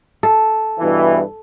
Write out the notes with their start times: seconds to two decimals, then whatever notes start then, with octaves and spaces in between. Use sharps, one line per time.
0.23 A4
0.79 G2 B2 E3